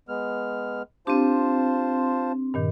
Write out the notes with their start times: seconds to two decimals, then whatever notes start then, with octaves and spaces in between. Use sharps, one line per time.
0.09 G#3 B3 F6
1.07 C4 D4 F4 G4 C5 A5 C6
2.54 G2 A#2 D#3